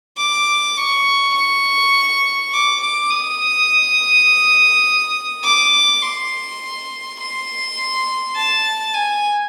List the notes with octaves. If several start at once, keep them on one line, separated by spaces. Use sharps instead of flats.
D6
C#6
C#6
D6
D6
D#6
D6
C6
C6
A5
G#5